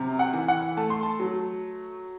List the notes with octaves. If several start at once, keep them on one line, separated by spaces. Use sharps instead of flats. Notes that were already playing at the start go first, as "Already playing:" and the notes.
Already playing: F#2 C3
F#5
E3
F#5
A3 A5
C6
A5
F#3